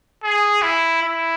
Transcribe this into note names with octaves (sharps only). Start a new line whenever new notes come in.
G#4
E4
E4